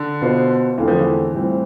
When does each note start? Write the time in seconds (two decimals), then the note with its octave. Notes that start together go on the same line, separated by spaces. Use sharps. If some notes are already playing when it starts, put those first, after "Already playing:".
Already playing: D3
0.21 B2 B3 F4 C5
0.78 E2 D3 E3 A3 C4 F4
0.88 F3
0.99 E3
1.33 A2 G3 C4 F4